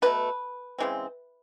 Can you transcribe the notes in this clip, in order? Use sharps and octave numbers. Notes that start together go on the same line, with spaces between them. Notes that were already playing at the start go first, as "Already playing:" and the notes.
B2 F#3 A3 B4
C#3 E3 G#3 C4